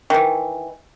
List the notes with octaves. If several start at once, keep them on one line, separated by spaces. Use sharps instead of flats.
D#3 E3